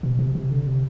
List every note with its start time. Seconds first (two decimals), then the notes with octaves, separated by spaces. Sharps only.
0.03 B2
0.19 C3
0.35 C3
0.51 D3
0.67 C3